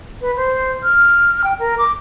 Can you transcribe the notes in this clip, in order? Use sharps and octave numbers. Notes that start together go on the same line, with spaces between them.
B4
C5
F6
G5
A#4
D6